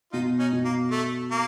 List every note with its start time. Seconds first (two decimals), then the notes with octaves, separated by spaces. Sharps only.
0.12 B2 D#4 F4
0.39 C#4 D#4
0.52 B2
0.65 A#3
0.91 A3
1.31 A#3